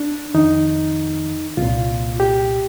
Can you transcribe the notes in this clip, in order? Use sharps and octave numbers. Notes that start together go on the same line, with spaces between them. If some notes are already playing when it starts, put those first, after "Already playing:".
Already playing: D4
F2 D#3 D#4
C2 F4
A#2
G4